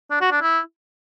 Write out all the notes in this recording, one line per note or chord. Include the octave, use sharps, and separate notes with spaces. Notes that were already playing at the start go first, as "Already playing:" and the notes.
D4
F#4
D4
E4